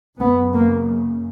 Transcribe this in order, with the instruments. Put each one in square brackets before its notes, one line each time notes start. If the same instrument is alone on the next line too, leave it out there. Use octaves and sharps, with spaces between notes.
[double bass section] F#2 C#3 B3
A#3